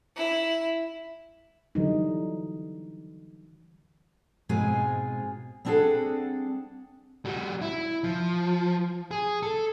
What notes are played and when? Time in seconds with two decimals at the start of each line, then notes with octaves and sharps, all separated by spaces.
0.15 E4
1.75 D3 E3 F#3 G3 D#4
4.49 G#2 B2 G#3 C4 F4 G#5
5.65 G3 C4 D4 G#4 A4 F#5
7.25 G3 F#4
7.62 E4
8.04 F3
9.11 G#4
9.43 A4